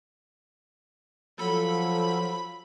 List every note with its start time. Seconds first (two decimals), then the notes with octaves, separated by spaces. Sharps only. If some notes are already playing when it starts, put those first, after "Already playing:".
1.39 F3 F#3 A4 B5